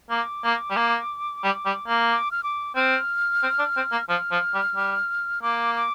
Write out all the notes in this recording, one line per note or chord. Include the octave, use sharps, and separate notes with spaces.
A#3 D6
A#3
G3
A#3
G3
G3
A#3
D6
F6
D6
C4 F6
C4
D4
C4
A#3
F3 F6
F3
G3
G3
A#3 D6
D6